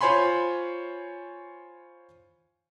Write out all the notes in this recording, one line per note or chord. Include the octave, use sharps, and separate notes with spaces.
F4 C5 C#5 G#5 B5 C6